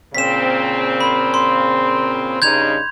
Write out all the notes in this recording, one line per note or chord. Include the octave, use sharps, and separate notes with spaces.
A#2 C#3 C4 B6 E7
B5
C6
G2 C#3 D#4 G6 G#6 F7